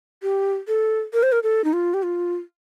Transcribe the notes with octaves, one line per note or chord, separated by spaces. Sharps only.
G4
A4
A#4
C5
A#4
A4
D#4
F4
G4
F4